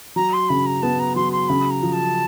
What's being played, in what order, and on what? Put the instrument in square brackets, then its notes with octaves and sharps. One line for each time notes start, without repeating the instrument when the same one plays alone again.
[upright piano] F#3 [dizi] A#5
[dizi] C6
[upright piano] C#3 [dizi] B5
[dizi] A#5
[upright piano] B3 [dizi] A5
[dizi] A#5
[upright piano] F#3 [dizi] C6
[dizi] C6
[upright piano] C#3 [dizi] B5
[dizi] A#5
[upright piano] F3
[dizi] A5